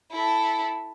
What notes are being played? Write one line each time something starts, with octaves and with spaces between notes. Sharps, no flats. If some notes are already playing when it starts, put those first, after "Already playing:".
E4 A4